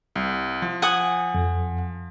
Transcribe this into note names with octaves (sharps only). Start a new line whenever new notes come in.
C2
F3
F#5 G#5 D#6
F2